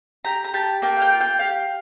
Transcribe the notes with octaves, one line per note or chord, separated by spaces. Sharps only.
G4 A#5
A#5
G4 A5
A#3 G5
F5
G5
F4
G5
G4 F5